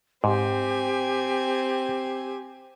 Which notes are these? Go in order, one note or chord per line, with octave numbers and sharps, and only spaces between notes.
G#2 C4 G4 G#5